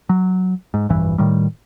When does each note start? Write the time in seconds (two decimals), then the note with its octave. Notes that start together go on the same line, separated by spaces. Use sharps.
0.09 F#3
0.74 G#2
0.89 F1 A#1 G2 E3
1.18 A2 D#3 G3